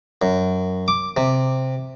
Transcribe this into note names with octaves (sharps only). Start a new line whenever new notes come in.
F#2
D6
C3